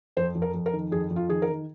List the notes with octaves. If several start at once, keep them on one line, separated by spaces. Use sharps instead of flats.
F2 C5
F2
A#4
F2
A#4
D#3
F2 G#4
F2
F4
D#3 G#4
A#4
D#3